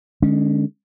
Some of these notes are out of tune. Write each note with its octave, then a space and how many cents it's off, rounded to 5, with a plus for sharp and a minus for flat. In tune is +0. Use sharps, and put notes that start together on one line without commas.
D3 +35 G#3 +0 C#4 +0